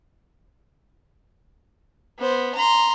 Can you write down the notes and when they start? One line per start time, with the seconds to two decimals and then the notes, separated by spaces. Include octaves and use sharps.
2.19 B3 C5
2.54 A#5 C6